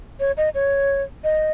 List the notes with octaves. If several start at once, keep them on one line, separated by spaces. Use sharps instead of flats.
C#5
D#5
C#5
D#5